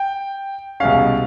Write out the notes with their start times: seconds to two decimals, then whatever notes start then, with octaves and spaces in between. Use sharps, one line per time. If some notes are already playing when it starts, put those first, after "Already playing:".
Already playing: G5
0.80 C2 B2 G#3 C#4 F5